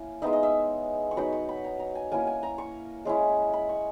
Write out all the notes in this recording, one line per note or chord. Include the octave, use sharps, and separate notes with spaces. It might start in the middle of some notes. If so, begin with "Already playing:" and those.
Already playing: A#3 C#4 E4 G#5
G#3 B3 D#4 E5
D#5
E5
C#6
F#3 B3 D#4 B5
C#6
B5
A#5
A#5
G#5
A#3 C#4 E4 G#5
G#5
A#5
C#6
G#3 C#4 E4
B5
C#6